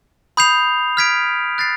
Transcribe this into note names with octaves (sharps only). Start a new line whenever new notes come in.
B5 D#6 G6 C7 F7
F6 G#6 B6 D7
F#6 A6 C7